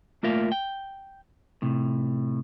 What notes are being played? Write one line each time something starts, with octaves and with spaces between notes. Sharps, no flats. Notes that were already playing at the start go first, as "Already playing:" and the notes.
A3 A#3 F4 A#4 E5 F5
G5
A2 C3